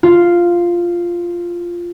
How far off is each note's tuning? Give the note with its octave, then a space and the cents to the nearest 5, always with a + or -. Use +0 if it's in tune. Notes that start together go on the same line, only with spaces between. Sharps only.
F4 -5